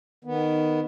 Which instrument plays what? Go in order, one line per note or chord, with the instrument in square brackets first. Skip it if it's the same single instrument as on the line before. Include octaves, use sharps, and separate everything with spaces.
[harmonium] D#3 B3